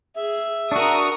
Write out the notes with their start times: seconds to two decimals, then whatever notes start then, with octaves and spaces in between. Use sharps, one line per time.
0.16 G#4 E5
0.72 D4 F#4 A#4 C#6 D#6